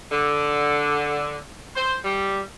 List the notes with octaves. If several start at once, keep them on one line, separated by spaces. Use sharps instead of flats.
D3
C5
G3